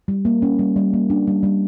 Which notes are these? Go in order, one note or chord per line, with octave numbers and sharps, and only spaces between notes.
G3
A#3
C#4
G3
G3
A#3
D4
G3
G3